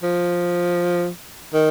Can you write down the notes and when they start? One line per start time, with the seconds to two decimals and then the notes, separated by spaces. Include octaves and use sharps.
0.03 F3
1.54 D#3